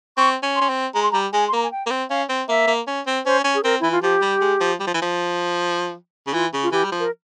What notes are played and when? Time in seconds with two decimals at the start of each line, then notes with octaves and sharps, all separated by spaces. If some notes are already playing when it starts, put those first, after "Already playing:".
0.17 C4 C#6
0.43 C#4
0.56 C6
0.61 C#4
0.69 C4
0.94 G#3 A#5
1.03 C6
1.12 G3 A#5
1.33 G#3 G#5
1.48 C6
1.53 A#3 A#5
1.63 G#5
1.72 G5
1.86 A#3
1.90 C4
2.10 C#4 F5
2.29 C4
2.48 A#3 E5
2.67 A#3
2.87 C#4
3.06 C4
3.25 C#4 C5
3.44 C#4
3.54 G#4
3.64 C4 A#4
3.80 E3 E4
3.92 F4
4.02 F3 G4
4.22 G3
4.41 G#3
4.61 F3
4.80 G3
4.87 F3
4.94 E3
5.02 F3
6.27 C#3
6.33 E3 F4
6.53 C#3
6.63 F4
6.72 E3 G4
6.84 G3
6.92 F3
7.00 A#4